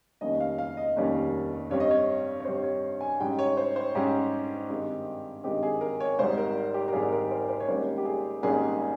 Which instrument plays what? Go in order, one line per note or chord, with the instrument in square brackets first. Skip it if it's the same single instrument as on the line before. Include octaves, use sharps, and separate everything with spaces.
[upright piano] F1 D#2 D#3 G3 C#4 D#5
F5
F5
D#5
F1 D#2 D#3 G3 C#4
G2 G3 C4 C#5
D#5
C#5
C#5
G2 G3 C4 C5
C#5
G#5
G#2 G3 C#4 G5
C#5
C5
C5
G#2 G3 C#4 G4
G2 D#3 G#3 C4
G2 D#3 G#3 C4 G4
G#4
A#4
C#5
G#1 G#2 G3 C5
A#4
G4
A#4
G#1 G#2 G3 G#4
A#4
C5
C5
C#5
G#1 G#2 G3 A#3 C#4 C5
G4
G#4
G#1 G#2 G3 A#3 C#4 G#4